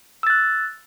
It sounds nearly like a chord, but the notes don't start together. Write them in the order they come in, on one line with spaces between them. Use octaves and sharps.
E6 A6 F#6